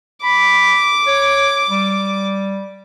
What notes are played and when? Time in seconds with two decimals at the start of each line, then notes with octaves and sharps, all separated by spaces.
0.23 B5 D6
1.07 C#5
1.69 G3